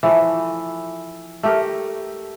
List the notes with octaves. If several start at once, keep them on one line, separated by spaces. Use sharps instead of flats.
E3 F3 A3
A3 G4 A#4